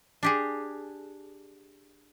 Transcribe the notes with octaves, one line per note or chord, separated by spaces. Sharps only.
D4 G4 G#4